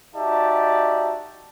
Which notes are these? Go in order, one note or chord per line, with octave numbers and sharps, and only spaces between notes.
D#4 F#4 G4 D5 E5 A5